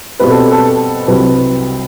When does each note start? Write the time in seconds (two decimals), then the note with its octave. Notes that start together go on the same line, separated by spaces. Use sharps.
0.20 B2 G3 C4 B4
0.30 A4
0.51 A4
1.08 C2 C3 F#3 C4 B4